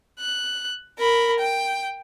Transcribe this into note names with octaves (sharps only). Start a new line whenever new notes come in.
F#6
A#4 B5
G5